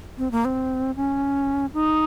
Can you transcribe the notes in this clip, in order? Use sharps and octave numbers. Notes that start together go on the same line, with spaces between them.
C4
A#3
C4
C#4
D#4